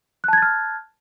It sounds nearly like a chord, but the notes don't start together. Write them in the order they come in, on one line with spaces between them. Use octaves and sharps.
F#6 A5 G#6 A6 F6